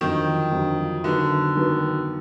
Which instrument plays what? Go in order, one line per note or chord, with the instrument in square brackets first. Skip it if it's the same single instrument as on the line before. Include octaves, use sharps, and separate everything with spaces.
[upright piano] F2 D3 F#3 [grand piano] D#3
[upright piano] F2 D3 F#3
[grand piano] D3 [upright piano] D#3 F#3 B3
[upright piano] D#3 F#3 B3